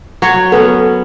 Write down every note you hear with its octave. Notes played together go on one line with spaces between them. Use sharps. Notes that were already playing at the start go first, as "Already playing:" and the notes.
F#3 C#5
B3 C#4 A4